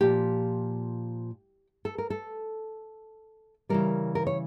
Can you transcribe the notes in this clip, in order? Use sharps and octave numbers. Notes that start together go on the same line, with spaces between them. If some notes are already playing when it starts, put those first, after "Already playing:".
A#2 F3 G4
A4
A#4
A4
C#3 E3 G3 A#4
A#4
C#5